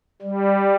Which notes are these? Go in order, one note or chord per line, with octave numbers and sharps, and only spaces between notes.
G3